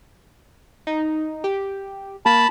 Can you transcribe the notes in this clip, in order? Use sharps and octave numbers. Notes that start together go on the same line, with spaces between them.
D#4
G4
A#3 A5 B5